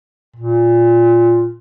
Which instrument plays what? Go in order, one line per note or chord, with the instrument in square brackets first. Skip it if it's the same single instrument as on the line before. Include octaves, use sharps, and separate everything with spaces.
[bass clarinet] A#2